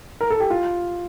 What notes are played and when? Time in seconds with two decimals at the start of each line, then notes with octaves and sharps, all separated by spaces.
0.21 A#4
0.30 A4
0.40 G4
0.50 F4